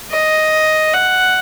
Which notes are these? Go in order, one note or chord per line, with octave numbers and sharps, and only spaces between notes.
D#5
F#5